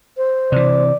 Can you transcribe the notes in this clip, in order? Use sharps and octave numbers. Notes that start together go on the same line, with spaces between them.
C5
C3 E3 D5